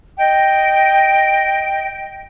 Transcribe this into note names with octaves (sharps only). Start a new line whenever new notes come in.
D#5 G5